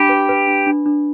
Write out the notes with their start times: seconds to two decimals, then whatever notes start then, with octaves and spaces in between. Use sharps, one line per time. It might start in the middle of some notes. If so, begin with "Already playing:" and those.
Already playing: D4 G4 B5
0.09 B4
0.29 B4
0.47 D4
0.66 D4
0.86 D4